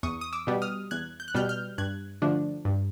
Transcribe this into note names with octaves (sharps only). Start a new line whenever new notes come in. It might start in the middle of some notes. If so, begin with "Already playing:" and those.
E2 C#6 D#6
D#6
D6 E6
B2 G3 B3
D#6 F6
E2 F#6 G#6
G6
F#6
B2 G3 B3 F6 G6
F6 G6
G2 F#6 G#6
D3 F3 A3 D4
G2